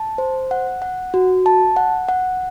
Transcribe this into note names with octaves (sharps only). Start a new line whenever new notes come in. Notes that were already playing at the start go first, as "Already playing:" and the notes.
Already playing: A5
C5
F#5
F#5
F#4
A5
F#5
F#5